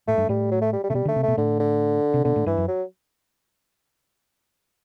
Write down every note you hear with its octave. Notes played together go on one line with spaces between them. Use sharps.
A2 A3
G2
A2 G3
F#3
A3
G3
G3
C3 A3
B2 G3
D3 A3
C3
B2 A3
A2 D3
D3
C3
B2 D3
A2
G2 E3
F#2
F#3